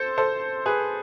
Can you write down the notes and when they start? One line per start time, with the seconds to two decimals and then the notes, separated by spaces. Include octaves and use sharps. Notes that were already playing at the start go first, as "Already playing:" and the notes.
Already playing: A4 C5
0.18 A4 C5
0.66 G#4 B4